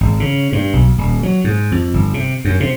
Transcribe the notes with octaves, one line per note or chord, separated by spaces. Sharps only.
G#1
C#3
G2
B1
D#1
F#3
G#2
F2
G1
C3
F#2
C3